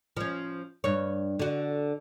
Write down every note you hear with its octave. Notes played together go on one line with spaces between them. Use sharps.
F3 C#4
G2 C#5
D3 F#4